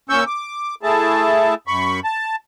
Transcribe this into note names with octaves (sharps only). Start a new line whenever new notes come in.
A#2 C#4 C#6 E6 G6
D6
A3 E4 G#4 A5
F#2 B5 C#6
A5